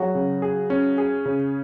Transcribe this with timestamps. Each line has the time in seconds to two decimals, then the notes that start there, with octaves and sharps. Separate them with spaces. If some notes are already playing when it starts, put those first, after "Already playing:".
Already playing: F#3 F#4 G#4
0.15 C#3
0.42 G#4
0.70 C#4
0.98 G#4
1.25 C#3